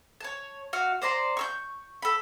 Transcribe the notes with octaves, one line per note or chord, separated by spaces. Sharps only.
C#5 A5
F#4 F5
C5 D5 A#5 C6
C#6 E6 G6
A4 B5